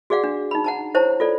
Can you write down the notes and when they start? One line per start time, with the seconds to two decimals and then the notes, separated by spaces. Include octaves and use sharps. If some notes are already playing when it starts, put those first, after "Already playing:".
0.10 F#4 G#4 D5 F5 F#5
0.24 D4
0.51 D#4 B5
0.64 F#5 A5 A#5
0.94 E4 C5 C#5 A5 A#5 C#6
1.20 F4 A4 D5